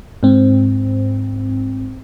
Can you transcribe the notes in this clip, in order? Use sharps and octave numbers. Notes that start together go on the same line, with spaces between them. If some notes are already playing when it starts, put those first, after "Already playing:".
G#2 C4